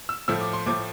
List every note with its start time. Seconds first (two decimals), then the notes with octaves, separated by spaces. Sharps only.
0.09 E6
0.28 A2 F3 A3 E6
0.41 D6
0.53 C6
0.66 A2 F3 A3 D6